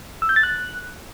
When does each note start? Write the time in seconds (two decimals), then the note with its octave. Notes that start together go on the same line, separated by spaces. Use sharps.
0.22 E6
0.29 G6
0.36 A6
0.43 F#6